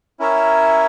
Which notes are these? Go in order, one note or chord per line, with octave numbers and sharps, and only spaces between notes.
C#4 E4 A#4 C#5 E5